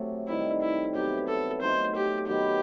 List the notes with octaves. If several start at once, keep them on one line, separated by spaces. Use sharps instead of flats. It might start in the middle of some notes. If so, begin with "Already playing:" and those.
Already playing: C3 F#3 A3
C3 D#3 G3 E4
E4
C3 F#3 B3 E4 G4
A4
F#3 A3 D#4 A4 C5
G4
D#3 F#3 B3 E4 G4